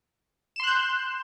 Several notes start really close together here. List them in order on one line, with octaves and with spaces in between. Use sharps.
E7 C6 F#6 G6